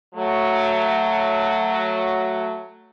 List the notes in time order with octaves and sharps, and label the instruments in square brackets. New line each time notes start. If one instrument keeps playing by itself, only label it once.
[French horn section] F#3 A3